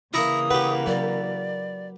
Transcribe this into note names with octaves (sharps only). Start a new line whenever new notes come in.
C#3 E3 A#3 E4 A#5 C#6 D#6
G4 B4 F#5
F#3 A#4 D5